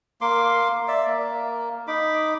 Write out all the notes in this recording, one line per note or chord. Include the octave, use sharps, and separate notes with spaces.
A#3 C6 D6
D5 E5
A#3
D#4 B5 D6